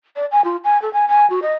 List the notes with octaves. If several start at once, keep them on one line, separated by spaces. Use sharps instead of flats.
D5
G#5
F4
G#5
A4
G#5
G#5
F#4
D#5